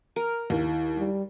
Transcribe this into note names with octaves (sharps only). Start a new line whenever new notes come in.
A#4
D#2 E4
G3